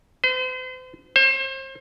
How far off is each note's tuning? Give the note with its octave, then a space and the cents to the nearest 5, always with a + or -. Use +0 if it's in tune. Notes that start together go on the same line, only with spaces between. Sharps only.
C5 -40
C5 +35